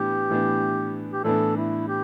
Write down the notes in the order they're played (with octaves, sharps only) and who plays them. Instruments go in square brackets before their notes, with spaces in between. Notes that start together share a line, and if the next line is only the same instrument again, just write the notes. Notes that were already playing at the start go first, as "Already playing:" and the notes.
Already playing: [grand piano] A2 E3 B3 D4 [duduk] G4
[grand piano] A2 E3 B3 D4
[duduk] G4
[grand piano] A2 E3 B3 D4 [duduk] A4
[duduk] E4
G4